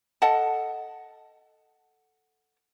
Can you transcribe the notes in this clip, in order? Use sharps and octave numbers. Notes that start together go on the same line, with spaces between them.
A4 D#5 F#5 A5